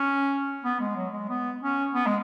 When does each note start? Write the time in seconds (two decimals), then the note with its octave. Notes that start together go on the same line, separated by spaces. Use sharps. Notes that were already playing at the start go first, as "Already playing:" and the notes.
Already playing: C#4
0.64 B3
0.80 G#3
0.96 F#3
1.13 G#3
1.29 B3
1.62 C#4
1.94 B3
2.06 G#3